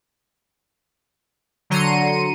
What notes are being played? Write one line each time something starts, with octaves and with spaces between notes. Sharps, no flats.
D3 F#3 A#5 C6 C#7 D#7